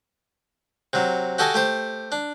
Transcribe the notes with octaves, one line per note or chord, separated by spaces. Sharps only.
C3 F#3
F#4 G4 A4 D#5 G#5
A3 G4 C5
D4